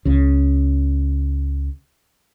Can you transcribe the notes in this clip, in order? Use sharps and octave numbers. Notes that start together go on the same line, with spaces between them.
C#2 C#3